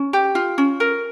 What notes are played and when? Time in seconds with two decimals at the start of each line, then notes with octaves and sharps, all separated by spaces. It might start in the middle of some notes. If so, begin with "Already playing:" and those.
Already playing: C#4
0.13 G4
0.35 F4
0.58 C#4
0.80 A#4